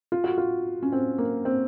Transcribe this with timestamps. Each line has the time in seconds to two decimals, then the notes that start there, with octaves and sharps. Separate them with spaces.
0.12 F4
0.24 F#4
0.38 F4
0.82 C#4
0.92 C4
1.18 A#3
1.45 C4